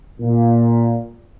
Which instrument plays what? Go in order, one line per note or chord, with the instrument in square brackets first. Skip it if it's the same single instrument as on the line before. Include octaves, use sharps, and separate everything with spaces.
[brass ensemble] A#2